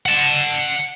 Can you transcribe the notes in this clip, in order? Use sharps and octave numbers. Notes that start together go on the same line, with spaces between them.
F#5 A5